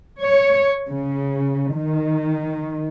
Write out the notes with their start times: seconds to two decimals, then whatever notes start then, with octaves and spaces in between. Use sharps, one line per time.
0.22 C#5
0.89 C#3
1.73 D#3